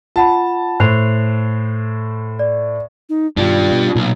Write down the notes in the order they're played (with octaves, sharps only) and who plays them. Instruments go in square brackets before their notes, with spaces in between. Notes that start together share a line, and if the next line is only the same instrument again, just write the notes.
[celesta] F4 F#5 B5 [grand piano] A5
[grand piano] A2 C5 [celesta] F#6 C7 F7
[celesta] D5
[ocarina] D#4
[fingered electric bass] G2 B2 D#3 [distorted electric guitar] G3 D4 [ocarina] F4
[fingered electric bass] B2
[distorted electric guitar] B1 [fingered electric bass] A#2